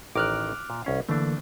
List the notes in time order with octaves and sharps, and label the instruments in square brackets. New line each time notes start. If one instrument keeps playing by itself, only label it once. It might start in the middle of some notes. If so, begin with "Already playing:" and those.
[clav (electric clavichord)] A1 D#3 A#4 [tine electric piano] D6 F6 F#6
[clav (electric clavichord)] A#2
C2 C#4 F5
[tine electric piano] D3 E3 A#3 [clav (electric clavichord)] A3 D4